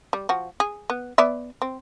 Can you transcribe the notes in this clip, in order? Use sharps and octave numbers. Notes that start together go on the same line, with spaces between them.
G3
F3 F#4
G#4
B3
B3 D5 E5
C4